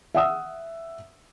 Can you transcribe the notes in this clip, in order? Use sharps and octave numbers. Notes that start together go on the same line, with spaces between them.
E5 F#5 D#6 E6